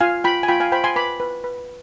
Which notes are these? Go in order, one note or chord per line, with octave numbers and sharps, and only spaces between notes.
F4 F5 G#5
F4 G5 B5
G#5
F4 G5 B5
F5 G#5
C5 G5 B5
G#5 C6
B4 B5 D6
B4
B4